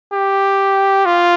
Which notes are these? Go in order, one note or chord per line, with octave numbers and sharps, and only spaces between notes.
G4
F4